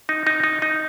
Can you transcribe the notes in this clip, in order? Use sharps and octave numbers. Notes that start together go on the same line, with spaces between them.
D#4
D#4
D#4
D#4